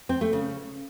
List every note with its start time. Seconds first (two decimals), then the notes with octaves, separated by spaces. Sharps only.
0.09 C4
0.21 A3
0.33 C#3